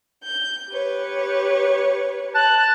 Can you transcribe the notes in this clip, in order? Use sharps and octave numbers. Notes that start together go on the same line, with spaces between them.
G6
G4 B4 C#5
A5 F#6